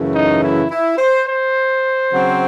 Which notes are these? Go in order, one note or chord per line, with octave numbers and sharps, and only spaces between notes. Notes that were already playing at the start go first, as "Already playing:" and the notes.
Already playing: F#2 C#3 E3 A3
D#4
E4
E4
C5
C5
C#3 F#3 C4